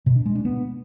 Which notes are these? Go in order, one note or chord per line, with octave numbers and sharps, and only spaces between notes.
B2
D4
G#3
D4
B3